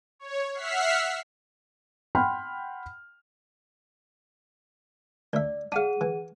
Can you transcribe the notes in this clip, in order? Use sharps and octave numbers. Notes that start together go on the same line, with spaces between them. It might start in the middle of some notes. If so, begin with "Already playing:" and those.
C#5
E5 F#5 F6 B6 C7
F#5 G5 B5 C6 F6
D2 D5 E5
D4 G#4 F5 F#5 D#7
E3